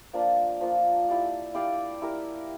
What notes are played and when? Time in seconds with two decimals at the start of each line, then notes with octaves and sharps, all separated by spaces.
0.13 F3 A#3 D4
0.61 F3 A#3 D4
1.08 E4 G4 D5 F5
1.54 E4 G4 D5 F5
2.02 E4 G4 A#4